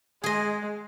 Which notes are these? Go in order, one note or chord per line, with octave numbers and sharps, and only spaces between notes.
G#3 G#4 D#5